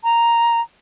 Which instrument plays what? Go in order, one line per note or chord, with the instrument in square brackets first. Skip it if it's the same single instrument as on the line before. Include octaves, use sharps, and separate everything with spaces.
[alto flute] A#5